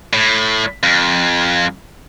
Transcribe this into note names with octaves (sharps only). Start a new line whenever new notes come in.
A2
F2